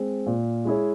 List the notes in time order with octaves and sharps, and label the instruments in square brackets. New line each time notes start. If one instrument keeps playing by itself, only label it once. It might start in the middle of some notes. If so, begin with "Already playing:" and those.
Already playing: [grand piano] G#3 C4
A#2
G#3 E4 G#4 C#5